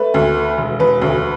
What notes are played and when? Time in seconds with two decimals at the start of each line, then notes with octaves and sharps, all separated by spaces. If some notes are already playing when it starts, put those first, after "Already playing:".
Already playing: A3 B4
0.14 D2
0.35 A3
0.58 E1
0.79 E1 B4
1.02 D2